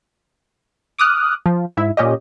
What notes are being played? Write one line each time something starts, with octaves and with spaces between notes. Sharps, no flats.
D6 D#6 F6 F#6
F3
G#2 E4 E5
A#2 C#4 G4 D#5